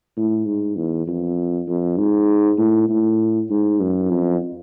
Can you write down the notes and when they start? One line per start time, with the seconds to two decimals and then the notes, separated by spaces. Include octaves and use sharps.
0.17 A2
0.46 G#2
0.77 E2
1.08 F2
1.68 F2
1.98 G#2
2.59 A2
2.89 A2
3.51 G#2
3.81 F#2
4.10 F2